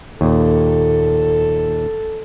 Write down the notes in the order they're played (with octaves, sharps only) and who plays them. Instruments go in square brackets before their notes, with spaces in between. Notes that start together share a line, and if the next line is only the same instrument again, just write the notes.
[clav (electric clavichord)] D#2 A#2 [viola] A4